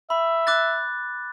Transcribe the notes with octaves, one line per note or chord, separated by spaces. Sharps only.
E5 B5
D6 F#6 A6